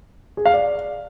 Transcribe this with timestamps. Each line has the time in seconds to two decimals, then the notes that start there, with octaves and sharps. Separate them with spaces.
0.37 G#4
0.46 F5
0.54 D5